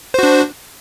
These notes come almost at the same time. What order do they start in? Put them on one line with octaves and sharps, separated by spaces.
C5 F#4 D4